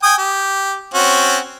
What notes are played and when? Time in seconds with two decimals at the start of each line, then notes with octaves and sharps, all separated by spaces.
0.03 G5 G#5 D#6
0.18 G4
0.94 C4 C#4 F#4